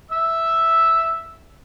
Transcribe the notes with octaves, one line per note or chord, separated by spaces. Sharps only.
E5 E6